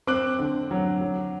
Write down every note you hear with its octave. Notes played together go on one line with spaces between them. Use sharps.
C4 D6 F#6
D3
F#3
F#3